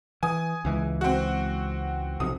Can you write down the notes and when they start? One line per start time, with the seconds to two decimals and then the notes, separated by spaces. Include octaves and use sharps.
0.23 E3 G#5 D#6
0.65 C#2 E3 G#3
1.01 C4 F#4
2.20 B1 F2 C3 D#6